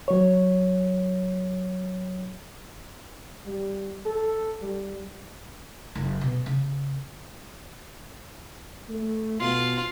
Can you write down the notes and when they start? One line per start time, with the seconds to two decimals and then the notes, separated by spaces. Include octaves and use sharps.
0.08 F#3 C#5
3.46 G3
4.06 A4
4.61 G3
5.95 F#1
6.21 B2
6.46 C#3
8.89 A3
9.40 B2 F4